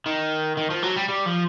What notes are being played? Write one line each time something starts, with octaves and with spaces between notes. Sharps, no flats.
D#3
D#3
F3
F#3
G3
G3
F3